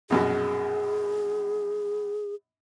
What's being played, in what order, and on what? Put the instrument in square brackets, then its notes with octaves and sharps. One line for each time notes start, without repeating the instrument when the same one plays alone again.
[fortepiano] A#1 F#2 B2 [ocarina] G#4